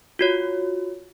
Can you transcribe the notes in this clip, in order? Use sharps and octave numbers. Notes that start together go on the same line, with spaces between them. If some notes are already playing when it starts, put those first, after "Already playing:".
F4 F#4 C#5